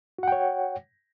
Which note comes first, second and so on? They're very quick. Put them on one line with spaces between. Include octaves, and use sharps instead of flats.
F#4 F#5 G5 C#5